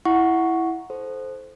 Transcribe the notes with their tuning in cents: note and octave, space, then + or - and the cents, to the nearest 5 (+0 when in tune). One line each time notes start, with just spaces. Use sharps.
E4 +0 F#5 +0 C#6 +0
A4 -25 C5 +0